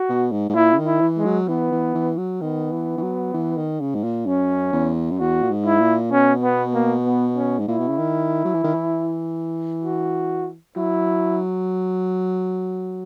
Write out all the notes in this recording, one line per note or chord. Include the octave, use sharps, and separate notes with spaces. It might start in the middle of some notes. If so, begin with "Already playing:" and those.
Already playing: F#4
B2
G#2
G#2
A#2 E4
C#3
D#3
E4
E3
G#3
F#3
E3 B3
E3
E3
F#3
D#3 B3
E3
E3
F#3
E3
D#3
C#3
G#2
A#2
F#2 C#4
E2
F#2
E2 F#4
A#2
G#2
E4
A#2
B2 C#4
B3
A#3
B3
C#4
G#2
A#2 E4
B2
C#3
D#3
F#3
E3
D#3
E3
F#4
F#3 E4